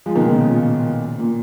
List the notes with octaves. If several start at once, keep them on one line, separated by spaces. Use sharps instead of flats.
F3 G#3
B2 D#3
A#2 C#3
A#2 C#3
A#2
A#2